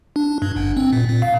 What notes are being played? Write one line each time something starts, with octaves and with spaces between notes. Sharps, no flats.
D4
G2
G1
C4
A#2
A#2
F5